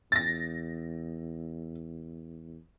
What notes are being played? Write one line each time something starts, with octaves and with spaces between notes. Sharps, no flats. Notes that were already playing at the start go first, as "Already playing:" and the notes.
E2 A6 A#6